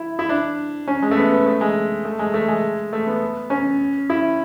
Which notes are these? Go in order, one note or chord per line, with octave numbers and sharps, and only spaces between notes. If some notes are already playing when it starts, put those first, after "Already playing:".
Already playing: E4
E4
D4
C#4
G#3
A3
B3
B3
A3
G#3
A3
G#3
A3
G#3
A3
B3
C#4
E4